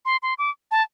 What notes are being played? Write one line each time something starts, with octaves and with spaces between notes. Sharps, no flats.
C6
C6
D6
A5